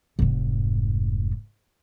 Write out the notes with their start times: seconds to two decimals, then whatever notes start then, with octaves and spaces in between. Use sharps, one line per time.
0.19 F1 G#2